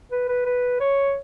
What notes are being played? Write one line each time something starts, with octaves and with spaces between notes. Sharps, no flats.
B4
B4
B4
C#5